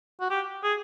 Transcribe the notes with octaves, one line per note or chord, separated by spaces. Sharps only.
F#4
G4
G#4